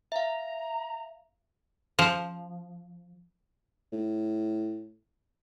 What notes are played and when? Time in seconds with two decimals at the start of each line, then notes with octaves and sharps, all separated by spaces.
0.12 E5 F5 A#5
1.99 F3
3.92 A2